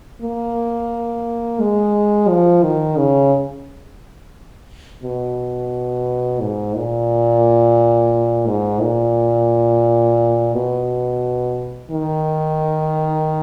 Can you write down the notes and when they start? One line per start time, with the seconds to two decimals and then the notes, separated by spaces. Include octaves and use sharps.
0.22 A#3
1.60 G#3
2.29 F3
2.63 D#3
2.97 C#3
5.03 B2
6.41 G#2
6.75 A#2
8.47 G#2
8.81 A#2
10.53 B2
11.91 D#3